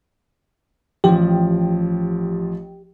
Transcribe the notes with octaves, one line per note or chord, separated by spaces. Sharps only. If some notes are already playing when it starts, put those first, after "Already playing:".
A1 F3 G4